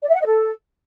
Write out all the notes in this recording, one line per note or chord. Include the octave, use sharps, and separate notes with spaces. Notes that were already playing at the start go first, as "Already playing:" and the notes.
D5
E5
F#5
D#5
A4